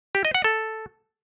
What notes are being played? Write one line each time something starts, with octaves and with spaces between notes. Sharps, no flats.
G4
D#5
F#5
A4